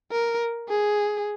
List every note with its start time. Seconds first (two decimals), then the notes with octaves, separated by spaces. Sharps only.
0.12 A#4
0.69 G#4